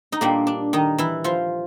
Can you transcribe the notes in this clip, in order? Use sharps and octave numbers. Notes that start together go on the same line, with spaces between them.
D#4
A#2 G3 A#3 D4
D4
D#3 D#4
E3 E4
F3 F4